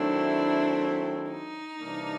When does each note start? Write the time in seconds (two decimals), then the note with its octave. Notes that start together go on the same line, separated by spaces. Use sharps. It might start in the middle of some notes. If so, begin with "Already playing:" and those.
Already playing: D#3 F#3 A3 C4 D4 E4
1.30 D#4
1.79 C3 E3 G3 A#3 D4